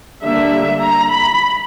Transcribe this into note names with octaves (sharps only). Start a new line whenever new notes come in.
D3 G3 A#3 D4 E5
A#5
B5